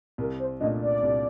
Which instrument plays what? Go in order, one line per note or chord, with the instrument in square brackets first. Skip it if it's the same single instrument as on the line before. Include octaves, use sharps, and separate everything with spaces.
[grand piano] C2 [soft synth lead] A#4
[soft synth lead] C5
[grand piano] A#2 A3 D4 [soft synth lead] D#5
[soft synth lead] D5
[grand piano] C2